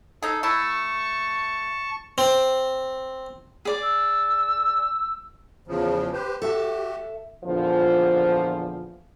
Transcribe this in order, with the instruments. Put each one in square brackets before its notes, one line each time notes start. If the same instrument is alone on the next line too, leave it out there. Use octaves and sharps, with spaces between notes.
[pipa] D#4 G#4 [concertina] A4
[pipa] A3 E4 [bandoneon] A5 [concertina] C#6
[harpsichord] C4
[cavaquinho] G#4 D5
[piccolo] E6
[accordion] E2 C#3 F3
G4 B4 C5
[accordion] F#4 G4 [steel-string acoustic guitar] A4 E5 A5
[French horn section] E2 A#2 D3 F3